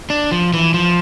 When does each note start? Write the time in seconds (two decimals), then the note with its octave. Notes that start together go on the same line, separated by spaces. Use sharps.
0.10 D4
0.31 F3
0.53 E3
0.74 F3